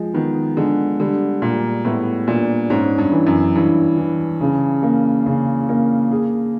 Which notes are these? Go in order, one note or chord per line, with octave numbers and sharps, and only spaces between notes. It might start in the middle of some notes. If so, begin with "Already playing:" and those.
Already playing: F3 G#3
D#3 B3
D3 G#3
D3 G3
A#2 G3
A2 B3
A#2 D4
G#2 C#4
G2
E3
F#2
G2 E3
E3
C#3
A#3
C#3
A#3
G#4